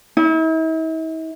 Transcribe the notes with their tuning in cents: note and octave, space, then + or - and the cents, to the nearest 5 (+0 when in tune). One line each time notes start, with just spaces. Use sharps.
E4 -45